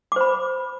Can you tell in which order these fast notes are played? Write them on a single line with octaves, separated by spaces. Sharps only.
D6 C5 B5